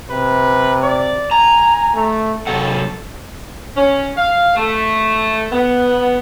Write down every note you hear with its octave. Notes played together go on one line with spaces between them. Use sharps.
C3 B4
D5
G#5 A#5
A3
D#2 C3 F#3 A4 F#5
C#4
F5
A3
B3